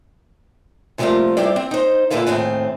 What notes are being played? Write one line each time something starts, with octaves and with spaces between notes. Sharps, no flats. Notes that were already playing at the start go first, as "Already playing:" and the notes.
C3 E3 F3 G3 A3 A#3
G3 E4 G4 A4 C5 E5
C4
D#4 C5
A#2 D3 E4 A4 B4 F5
D#2 A2 A3 C4 G#4